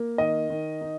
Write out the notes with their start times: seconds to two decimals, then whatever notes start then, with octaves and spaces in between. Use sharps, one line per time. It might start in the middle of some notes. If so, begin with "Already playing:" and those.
Already playing: A#3
0.18 D#3 D#5
0.50 D#3
0.81 D#4